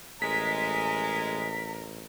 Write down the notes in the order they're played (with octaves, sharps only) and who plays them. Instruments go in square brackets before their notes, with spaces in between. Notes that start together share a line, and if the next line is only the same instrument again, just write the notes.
[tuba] A1 [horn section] G#3 [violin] A#4 [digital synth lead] B6